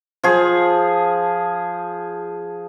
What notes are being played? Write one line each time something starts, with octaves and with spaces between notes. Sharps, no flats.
F3 G#4